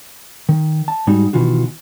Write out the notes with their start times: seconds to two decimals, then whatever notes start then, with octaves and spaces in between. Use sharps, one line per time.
0.49 D#3
0.88 A5
1.07 G#2 G3 D#4 F#4
1.33 B2 D#3 E3 F4 F#4